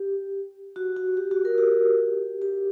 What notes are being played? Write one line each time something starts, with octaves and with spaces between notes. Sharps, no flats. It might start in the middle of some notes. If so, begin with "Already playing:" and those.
Already playing: G4
F#4
F#4
G4
F#4
A#4
G4
G4